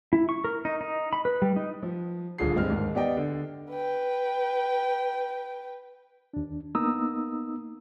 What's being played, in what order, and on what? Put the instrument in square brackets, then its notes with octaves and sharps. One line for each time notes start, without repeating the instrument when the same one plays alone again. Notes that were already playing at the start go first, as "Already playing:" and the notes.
[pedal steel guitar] E4
C#6
A#4
D#4
D#4
B5
B4
G3
D#4
[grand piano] F3
D#1 D3 F4 G#4 C7
G2 G#3 C4 F6
D#2 G#2
B3 G4 D5 D#5 G5
D3
[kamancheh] B4 G5
[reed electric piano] D#2 D4
A#3 B3 D#4 A#5 D#6 E6